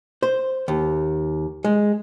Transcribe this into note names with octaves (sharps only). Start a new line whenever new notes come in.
C5
D#2
G#3